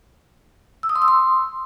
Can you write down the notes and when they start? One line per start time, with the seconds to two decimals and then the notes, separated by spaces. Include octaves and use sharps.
0.83 E6
0.89 D#6
0.96 C6
1.02 E6
1.08 C6